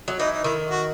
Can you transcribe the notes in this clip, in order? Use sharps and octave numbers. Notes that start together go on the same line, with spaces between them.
F#3
E3 D#4
D#4
D#3 E4
F#4